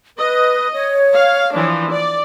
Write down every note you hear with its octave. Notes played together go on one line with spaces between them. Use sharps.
B4 D#5
C#5
F5
E3 F3 D4
D5